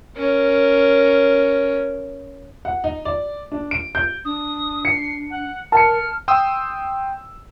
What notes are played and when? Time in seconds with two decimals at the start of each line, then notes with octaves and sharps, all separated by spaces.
0.16 C#4 A#4
2.65 F#5
2.84 D#4
3.05 D5
3.52 D4
3.71 D7
3.95 G6
4.25 D4 D#6
4.85 C7 C#7
5.30 F#5
5.72 A#4 A5 F6 C#7
6.28 G5 C6 D#6 E6